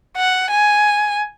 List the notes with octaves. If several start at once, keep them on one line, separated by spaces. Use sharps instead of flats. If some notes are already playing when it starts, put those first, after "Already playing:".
F#5
G#5